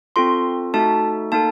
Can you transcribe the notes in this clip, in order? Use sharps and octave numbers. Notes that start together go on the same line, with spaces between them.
C4 F4 A4 C6
A3 D#4 F#4 A4 A5
A#3 D#4 A4 A5